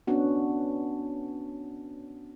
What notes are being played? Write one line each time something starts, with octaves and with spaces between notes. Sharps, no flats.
B3 C#4 D4 F#4